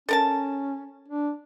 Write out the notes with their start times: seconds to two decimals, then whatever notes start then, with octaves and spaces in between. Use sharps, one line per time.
0.09 C#4 A4 A#4 A5
1.08 D4